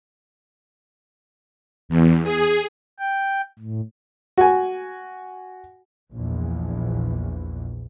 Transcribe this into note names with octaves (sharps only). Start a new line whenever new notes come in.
E2
G#4
G5
A2
F#4 G#5
A#1 E2